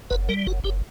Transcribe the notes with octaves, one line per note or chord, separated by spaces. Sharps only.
F#1 B4
G3 A#4
F#1 F#4
F#1 G4